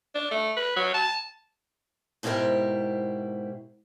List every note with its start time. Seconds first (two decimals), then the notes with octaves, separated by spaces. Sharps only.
0.15 D4
0.31 A3
0.57 B4
0.76 F#3
0.94 A5
2.23 G#2 B2 E4 G4 A#4 C5